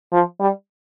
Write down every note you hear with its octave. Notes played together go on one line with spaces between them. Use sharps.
F3
G3